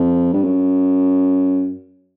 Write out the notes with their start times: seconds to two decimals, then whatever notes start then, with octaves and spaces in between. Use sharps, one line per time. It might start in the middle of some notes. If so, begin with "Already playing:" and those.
Already playing: F2
0.33 G2
0.44 F#2